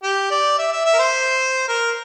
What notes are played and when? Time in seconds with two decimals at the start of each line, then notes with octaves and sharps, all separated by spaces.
0.03 G4
0.31 D5
0.58 E5
0.72 E5
0.85 E5
0.93 A#4
0.99 C5
1.68 A#4